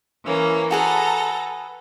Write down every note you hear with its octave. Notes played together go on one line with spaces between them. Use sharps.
E3 A#3 C#4
F#4 G#4 A4 B4 A#5